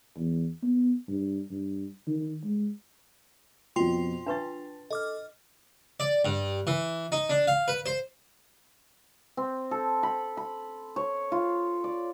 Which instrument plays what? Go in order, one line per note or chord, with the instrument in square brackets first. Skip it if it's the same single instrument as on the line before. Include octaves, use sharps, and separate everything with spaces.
[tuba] E2
B3
G2
G2
D#3
G#3
[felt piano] F2 B2 [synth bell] F4 G5 C6
[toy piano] D4 B4 C#6 [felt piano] A5 A6
[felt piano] A4 [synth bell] D#5 D6 F6
[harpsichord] D5
G2
E3
D#4
D4
F5
B4
C5
[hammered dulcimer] C4
A4
B5
B5
C#5
F4
D5